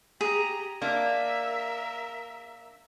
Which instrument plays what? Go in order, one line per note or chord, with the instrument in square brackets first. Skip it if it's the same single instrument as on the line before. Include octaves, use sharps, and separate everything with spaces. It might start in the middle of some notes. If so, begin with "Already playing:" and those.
[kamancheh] G4 A#5 [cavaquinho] G#4
[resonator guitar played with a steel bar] A#3 D4 [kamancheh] A#4 E5